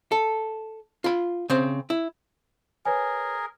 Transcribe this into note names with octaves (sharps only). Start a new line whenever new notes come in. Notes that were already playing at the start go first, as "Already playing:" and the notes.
A4
F4 B5
C#3 C4 C5
E4
G#4 A#4 B4 C#5 G#5